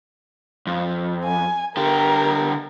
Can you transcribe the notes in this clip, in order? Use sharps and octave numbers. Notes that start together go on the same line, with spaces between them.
F2
G#5
D3 G4 A#4